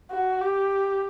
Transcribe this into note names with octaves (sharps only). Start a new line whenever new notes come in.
F#4
G4